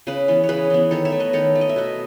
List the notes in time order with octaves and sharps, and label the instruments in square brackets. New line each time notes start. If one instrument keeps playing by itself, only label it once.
[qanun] C#3 G#4 B4
E3 B3
C#5
C#3 G#4 B4
E3 B3
D#3 A4 C#5
C#5 E5
A3
B4 D#5
D#3 A4 C#5
A3
D#5
E5
B2 B4 D#5